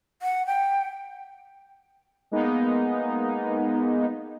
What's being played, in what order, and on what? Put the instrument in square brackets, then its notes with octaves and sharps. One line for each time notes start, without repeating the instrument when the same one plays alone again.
[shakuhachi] F#5
G5
[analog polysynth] G#3 A#3 B3 D#4